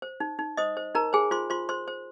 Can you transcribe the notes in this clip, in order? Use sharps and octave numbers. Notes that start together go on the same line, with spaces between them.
C5
D#4
D#4
C5 D#5 D#6
C5
D#4 A#4 A#5
G#4 C5 G#5
F4 C5 C6
F4 C5 C6
C5 C6
C5